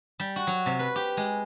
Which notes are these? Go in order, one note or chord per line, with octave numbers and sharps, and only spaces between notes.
G3
F#4
F#3
C3
B4
G4
G#3